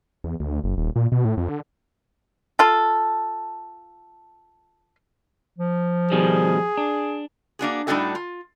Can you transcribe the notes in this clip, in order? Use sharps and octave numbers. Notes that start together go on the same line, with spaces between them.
E2
D2
F#1
D#1
A#2
B2
A2
F2
D3
F4 A4
F3
B2 D#3 G3 G#4
D4
A#3 D4 F#4 G#4
A2 G3 D4 D#4 F#4 A4
F4